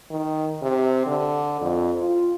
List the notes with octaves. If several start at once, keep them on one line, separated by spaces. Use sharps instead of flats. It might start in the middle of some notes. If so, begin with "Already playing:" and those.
D#3
C3
D3
F2
F4